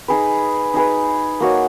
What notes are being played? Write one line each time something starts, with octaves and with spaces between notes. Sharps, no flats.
D#4 G#4 B4
D#4 G#4 B4
A#3 D#4 F#4 C#5